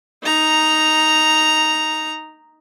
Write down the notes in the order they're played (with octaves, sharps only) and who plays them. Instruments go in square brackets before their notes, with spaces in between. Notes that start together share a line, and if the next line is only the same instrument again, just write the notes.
[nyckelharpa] D#4 A#5